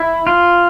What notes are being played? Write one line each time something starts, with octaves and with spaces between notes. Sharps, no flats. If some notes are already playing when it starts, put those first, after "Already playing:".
Already playing: E4
F4